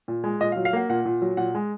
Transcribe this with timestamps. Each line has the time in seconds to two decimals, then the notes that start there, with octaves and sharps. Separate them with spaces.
0.08 A#2
0.24 G#3
0.40 A#2 D#5
0.52 F5
0.56 F#3
0.65 F5
0.73 A#3 F#5
0.89 A#2 F#5
1.05 A#2
1.22 F#3
1.37 A#2 F#5
1.55 G#3